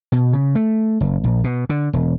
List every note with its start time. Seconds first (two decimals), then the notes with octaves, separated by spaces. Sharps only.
0.12 B2
0.33 C#3
0.55 A3
1.01 F#1
1.24 A#1
1.44 B2
1.69 D3
1.93 E1